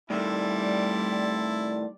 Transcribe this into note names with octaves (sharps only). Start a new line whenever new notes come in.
A2 D#3 G3 A3 E4 D5 A5 C6